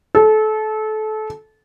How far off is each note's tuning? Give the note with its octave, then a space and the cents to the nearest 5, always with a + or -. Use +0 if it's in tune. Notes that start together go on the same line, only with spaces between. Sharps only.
A4 -25